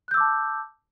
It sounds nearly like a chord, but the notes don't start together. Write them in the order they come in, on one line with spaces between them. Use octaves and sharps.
F#6 G6 E6 D6 A5